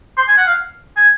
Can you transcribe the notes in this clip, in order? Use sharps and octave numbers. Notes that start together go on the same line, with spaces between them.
C6
G#5
F#5
F5
G#5